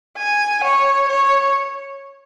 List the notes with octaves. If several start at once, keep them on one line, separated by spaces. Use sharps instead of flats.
G#5
C#5
C#5